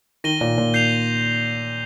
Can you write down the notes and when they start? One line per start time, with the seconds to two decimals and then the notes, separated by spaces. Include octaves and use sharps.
0.24 D#3 A#6 D#7 G7
0.41 A#2
0.58 A#2
0.74 G6 C7 F7